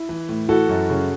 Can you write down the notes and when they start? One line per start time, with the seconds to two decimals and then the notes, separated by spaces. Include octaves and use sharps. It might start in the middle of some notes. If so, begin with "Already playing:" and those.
Already playing: E4
0.09 E3
0.29 A2
0.49 E3 F#4 A4
0.69 F#2
0.90 C#3